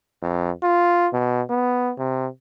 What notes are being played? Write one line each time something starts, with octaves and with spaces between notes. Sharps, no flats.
F2
F4
B2
B3
C3